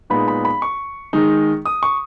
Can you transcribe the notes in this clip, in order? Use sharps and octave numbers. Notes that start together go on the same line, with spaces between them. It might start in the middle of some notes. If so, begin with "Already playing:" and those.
A#2 G#3 B3 D#4 B5
B5
B5
C#6
D#3 G#3 D#4
D#6
C#6